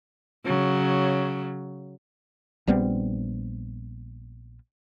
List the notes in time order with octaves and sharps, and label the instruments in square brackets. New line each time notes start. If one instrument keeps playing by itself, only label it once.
[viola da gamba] C#3 F#3
[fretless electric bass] A#1 G3 B3 C4